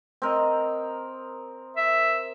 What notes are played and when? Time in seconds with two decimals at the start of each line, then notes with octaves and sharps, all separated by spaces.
0.22 C4 A#4 D#5
1.77 E5